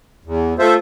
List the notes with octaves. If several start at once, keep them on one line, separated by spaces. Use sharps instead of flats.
E2
A3 F4 A4 C5 E5